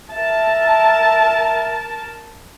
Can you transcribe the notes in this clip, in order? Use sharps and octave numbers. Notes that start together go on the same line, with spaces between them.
A#4 E5 A5